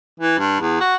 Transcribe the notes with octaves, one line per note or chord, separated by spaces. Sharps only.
E3
G2
E2
F#4